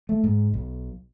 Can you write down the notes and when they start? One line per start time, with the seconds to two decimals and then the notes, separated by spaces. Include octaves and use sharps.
0.09 A3
0.24 G#2
0.54 B1